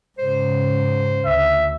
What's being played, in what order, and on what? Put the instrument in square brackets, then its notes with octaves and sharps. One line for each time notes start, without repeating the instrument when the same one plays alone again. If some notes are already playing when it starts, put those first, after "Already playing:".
[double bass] G#2 C#3 [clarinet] C5
[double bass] D2 [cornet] E5